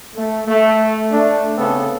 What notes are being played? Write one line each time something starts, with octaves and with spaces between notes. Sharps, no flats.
A3
A3
A3 D4
C#3 B3 C4 A4